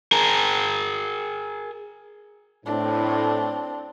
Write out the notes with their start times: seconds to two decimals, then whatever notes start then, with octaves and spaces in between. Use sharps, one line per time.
0.12 G#4 A#4
2.66 A2 C4 D4